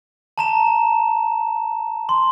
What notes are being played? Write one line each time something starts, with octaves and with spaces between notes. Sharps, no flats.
A5 A#5 E7
C6